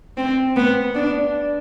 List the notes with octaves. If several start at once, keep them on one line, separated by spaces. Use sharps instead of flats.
C4
B3
D4